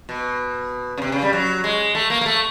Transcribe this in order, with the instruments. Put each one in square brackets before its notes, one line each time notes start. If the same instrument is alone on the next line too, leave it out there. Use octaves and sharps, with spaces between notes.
[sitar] B2
C#3
C3
C#3
G3
F#3
G#3
A3
A#3
A#3
A3